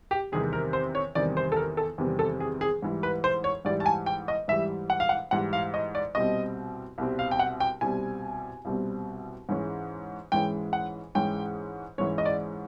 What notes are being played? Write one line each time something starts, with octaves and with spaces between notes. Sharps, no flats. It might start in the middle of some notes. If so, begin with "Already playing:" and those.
G4
E2 C3 D#3 G3 C4 G#4
A#4
C5
C#5
E2 C3 D#3 G3 C4 D5
C5
A4
A#4
A4
E2 C3 D#3 G3 C4
A4
G#4
G#4
G#2 E3 G3
B4
C5
C#5
G#2 E3 G3 D5
A5
G#5
G5
D#5
G#2 E3 G3 E5
F#5
F5
F#5
G#2 E3 G3 F#5
F5
D#5
D5
C2 B2 G3 C4 D#5
C2 B2 G3 C4
F5
G5
F#5
G5
C2 B2 G3 C4 G#5
C2 B2 G3 C4
G#2 E3 G#3 C#4
G#2 E3 G#3 C#4 G5
F#5
G#2 E3 G#3 C#4 G5
G#2 E3 G#3 C#4 C#5
D#5
D5